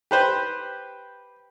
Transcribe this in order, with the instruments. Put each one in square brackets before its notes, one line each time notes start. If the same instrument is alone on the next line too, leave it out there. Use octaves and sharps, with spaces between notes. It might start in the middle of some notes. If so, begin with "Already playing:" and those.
[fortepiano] G4 B4 C5